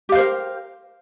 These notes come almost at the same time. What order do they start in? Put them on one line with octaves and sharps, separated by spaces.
G4 F5 C5 A#4